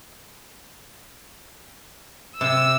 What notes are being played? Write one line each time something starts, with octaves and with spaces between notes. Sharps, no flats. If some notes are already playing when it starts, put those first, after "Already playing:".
C3 E6